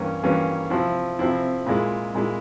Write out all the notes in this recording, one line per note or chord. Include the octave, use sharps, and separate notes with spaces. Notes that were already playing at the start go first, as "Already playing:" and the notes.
Already playing: G2 E3 A#3 C#4
G2 E3 A#3 C#4
C3 F3 C4 E4
C3 F3 C4 E4
A#2 G#3 E4
A#2 G#3 E4